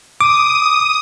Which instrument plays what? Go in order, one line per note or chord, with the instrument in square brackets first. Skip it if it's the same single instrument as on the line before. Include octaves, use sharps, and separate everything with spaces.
[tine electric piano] D6 [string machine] D#6